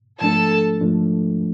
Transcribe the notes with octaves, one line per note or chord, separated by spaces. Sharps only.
G#2 F3 A3 D4 A4 A5
G#2 F3 A3 D4